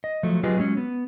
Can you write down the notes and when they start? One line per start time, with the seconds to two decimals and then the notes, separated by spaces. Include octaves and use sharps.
0.04 D#5
0.23 F3 F#3 A3
0.43 F#3 F4 G4 G#4 B4 D#5
0.58 F#3 G#3 B3 C#4
0.77 B3